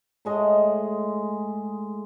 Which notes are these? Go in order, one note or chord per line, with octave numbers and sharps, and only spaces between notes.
A2 G#3 D#5